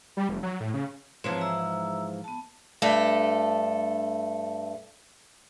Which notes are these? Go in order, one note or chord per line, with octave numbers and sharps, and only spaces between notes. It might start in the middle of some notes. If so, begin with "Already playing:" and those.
G3
F1
F#3
A2
C#3
G#2 E3 F3 C4 C#5 A5
E5 A#5 E6
B3 A5
G2 A3 A4